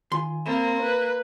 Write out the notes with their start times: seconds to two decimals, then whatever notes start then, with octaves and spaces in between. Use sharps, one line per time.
0.12 D#3 F4 G#5 C6
0.46 A#3 C4 B5 A6
0.82 B4